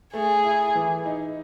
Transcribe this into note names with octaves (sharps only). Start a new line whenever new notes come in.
A3 G#4
E4
E3
D#4